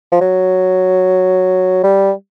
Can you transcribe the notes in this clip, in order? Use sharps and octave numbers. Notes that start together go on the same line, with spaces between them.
F3
F#3
G3